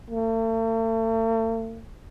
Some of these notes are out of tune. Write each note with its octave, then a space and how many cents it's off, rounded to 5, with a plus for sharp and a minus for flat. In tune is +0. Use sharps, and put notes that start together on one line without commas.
A3 +45